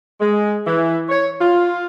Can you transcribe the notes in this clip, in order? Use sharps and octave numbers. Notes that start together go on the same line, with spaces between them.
G#3
E3
C#5
F4